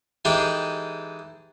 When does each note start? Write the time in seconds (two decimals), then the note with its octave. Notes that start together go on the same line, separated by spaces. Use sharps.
0.25 E3 G#3 D#4 G4 A4